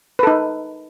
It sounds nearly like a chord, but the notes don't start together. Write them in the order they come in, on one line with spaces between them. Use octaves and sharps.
B4 A4 D#4